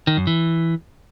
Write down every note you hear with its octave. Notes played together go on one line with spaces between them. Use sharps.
D#3
F#2
E3